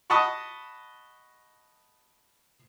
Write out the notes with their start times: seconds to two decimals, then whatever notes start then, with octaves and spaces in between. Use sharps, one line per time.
0.10 D#5 F#5 A5 B5 C#6